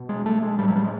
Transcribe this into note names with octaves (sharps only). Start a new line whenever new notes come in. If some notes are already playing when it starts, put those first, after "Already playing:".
Already playing: B2
G#3
A3
G#3
A2 G3
F#3
G3
G#3